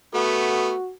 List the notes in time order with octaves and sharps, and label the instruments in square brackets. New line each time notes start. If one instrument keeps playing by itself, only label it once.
[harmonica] A3 B3 [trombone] F#4